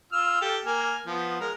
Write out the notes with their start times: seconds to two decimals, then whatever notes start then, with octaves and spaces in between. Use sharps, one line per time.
0.13 F4 E6 F6
0.41 G4 A4
0.66 A#3 G#5 F6
1.06 F3 B3
1.40 G#3 A#4